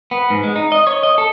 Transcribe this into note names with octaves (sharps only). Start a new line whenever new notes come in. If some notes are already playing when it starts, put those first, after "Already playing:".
B3
G#2
G#3
D#4
D#5
C#5
D#5
A4